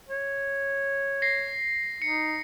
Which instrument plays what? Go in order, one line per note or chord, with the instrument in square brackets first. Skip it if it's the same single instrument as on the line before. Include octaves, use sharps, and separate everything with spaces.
[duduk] C#5
[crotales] A#6 C7
[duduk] D#4 [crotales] C#7